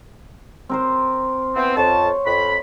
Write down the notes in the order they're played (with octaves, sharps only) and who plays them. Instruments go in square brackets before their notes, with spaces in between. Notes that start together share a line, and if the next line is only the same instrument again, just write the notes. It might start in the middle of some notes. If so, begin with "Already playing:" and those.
[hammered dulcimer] C4 A#4 C5
[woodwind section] E3 B3 C4
[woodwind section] F2 A5 [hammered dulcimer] C5 C#5 F#5
[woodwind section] F2 B5